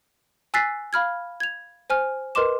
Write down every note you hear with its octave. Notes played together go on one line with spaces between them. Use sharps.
G#5 E6 F#6 A6 B6 C7
F5 B5 F6 G#6
G#6 F7
C5 G#5 F6
A#4 B4 D#5 C6 D6 E7